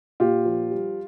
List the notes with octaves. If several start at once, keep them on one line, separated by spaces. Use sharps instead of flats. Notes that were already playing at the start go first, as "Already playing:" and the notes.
A#2 F4 G4
F3
G3